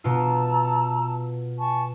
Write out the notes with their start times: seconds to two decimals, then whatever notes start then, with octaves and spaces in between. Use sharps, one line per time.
0.04 B2 F4 A5 A#5 E6
1.58 G#5 A5 C#6